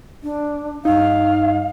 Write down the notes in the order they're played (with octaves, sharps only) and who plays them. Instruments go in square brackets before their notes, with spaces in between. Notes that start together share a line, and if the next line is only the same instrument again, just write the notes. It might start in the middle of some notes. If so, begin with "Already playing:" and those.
[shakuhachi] D4
[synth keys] G2 D#4 [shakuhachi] F5